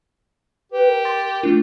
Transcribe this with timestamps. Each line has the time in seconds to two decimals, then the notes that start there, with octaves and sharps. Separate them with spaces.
0.72 G4 B4
0.88 A#4
1.05 C6 D6 A6
1.43 A3 D4 F4